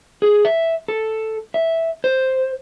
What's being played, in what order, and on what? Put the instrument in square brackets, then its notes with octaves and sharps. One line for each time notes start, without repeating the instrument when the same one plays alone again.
[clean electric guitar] G#4
E5
A4
E5
C5